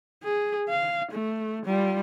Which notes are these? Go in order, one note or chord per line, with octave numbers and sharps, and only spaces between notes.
G#4
F5
A3
G3 F4